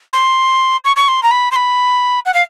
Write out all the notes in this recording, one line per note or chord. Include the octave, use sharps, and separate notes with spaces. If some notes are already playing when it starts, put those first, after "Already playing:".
C6
C#6
C#6
C6
A#5
B5
C6
B5
F#5
F5